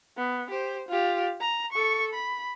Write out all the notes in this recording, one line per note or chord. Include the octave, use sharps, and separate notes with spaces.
B3
G4 C5
F4 G4
A#5
A4 C#6
B5